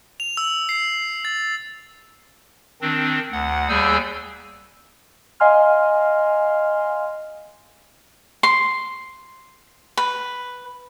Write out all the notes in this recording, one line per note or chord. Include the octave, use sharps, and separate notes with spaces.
F7
E6
C7
A6
D#3 C4 D4
D2 F#5
D#2 G3 G#4 G#5 E6 G6
D#5 F5 G#5 C6 F6
C6
B4